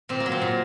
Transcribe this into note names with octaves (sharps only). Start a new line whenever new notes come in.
A#2 C4
A#3
F#3
C4
A#2